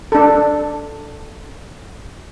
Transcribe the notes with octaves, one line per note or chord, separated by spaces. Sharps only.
D4 A4